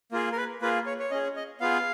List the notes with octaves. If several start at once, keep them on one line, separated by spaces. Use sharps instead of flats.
A#3 F4 G#4
A#4
B4
A#3 F4 G#4 B4
C#5
C#5
C#4 G#4 D#5
D#5
B3 F4 G#4 F5